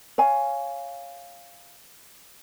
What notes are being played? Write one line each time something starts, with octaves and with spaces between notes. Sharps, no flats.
C#5 F5 G#5